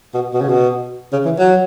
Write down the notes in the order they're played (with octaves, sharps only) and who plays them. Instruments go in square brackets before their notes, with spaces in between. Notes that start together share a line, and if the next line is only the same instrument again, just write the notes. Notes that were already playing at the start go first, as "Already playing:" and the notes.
[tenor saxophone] B2
B2
C#3
B2
C#3
E3
F#3